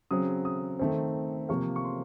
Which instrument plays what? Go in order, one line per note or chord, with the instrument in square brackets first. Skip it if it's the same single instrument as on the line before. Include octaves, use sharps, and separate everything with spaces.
[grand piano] C#3 F#3 C4 D#6
D#6
D#3 A3 C4
C3 F3 A#3 C#6
C#6
C6